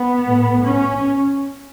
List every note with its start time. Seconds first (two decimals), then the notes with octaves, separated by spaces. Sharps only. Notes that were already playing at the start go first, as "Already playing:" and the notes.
Already playing: B3
0.25 A2
0.64 C#4